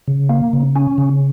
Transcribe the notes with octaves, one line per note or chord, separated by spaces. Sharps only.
C#3
A#3
C#3
C#4
C#3